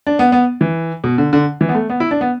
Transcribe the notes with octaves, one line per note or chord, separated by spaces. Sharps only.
D4
B3
B3
E3
B2
D3
D3
E3
B3
A3
B3
E4
D4
B3